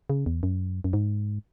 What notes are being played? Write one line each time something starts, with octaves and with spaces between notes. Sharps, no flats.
C#3
E2
F#2
F#2
G#2